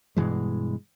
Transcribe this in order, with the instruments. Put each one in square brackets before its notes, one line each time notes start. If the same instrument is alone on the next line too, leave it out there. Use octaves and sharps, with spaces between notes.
[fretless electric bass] G2 B2 E3 G#3